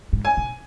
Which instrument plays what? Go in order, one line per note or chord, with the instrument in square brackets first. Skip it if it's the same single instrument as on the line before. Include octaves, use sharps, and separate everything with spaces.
[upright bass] G#2
[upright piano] G#5
[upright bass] B2